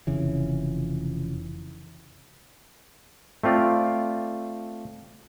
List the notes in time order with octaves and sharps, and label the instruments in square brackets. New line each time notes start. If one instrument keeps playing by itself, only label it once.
[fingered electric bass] F1 C#3 E3
[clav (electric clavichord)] A3 C4 F4 D5